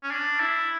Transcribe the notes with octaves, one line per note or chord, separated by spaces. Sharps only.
C#4
D4
E4